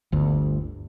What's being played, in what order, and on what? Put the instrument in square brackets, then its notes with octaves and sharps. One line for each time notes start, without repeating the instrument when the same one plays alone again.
[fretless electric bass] G1 D2